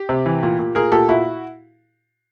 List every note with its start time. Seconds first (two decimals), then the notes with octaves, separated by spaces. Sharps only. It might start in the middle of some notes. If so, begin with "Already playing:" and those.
Already playing: G4
0.09 C3
0.26 E3
0.43 A#2
0.59 A#2
0.75 A#2 G#4 A#4
0.92 A#2 G4 A4
1.08 A#2 E4 F#4